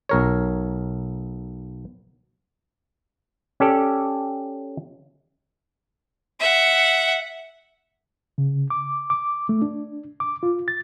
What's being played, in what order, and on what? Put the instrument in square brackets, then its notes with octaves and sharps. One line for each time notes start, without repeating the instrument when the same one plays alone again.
[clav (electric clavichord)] B1 A#4 C#5
C#4 G4 A4 D5
[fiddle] E5 F#5
[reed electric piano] C#3
D6
D6
A3
D4
D6
F4
A6